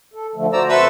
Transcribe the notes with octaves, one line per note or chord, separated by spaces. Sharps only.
A4
D3 F3 A3
F#4 C5 D5 A#5 E6
F2 A4 B4 C5 E5